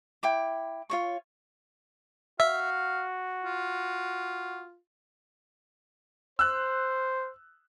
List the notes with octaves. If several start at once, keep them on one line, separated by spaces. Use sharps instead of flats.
E4 G5 D6
F4 C#5 C#6
F#4 E5 F5
F4
C5 E6 F#6